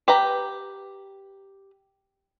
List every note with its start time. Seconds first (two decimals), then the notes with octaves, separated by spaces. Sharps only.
0.08 G4 B4 A#5